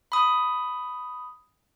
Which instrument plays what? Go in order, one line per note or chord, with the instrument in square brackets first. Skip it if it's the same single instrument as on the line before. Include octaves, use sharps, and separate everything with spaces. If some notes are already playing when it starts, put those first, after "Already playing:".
[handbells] B5 D#6